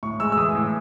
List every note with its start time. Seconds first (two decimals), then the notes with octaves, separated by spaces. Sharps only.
0.03 A2 C#6
0.20 G#3 E6
0.32 E6
0.37 E3 D#6
0.55 A2